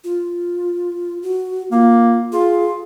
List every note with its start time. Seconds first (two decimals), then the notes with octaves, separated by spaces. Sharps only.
0.04 F4
1.22 F#4
1.72 A#3 F4
2.32 F4 G#4